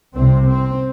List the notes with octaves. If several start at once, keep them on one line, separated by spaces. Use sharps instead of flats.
C2 C3 C4
C4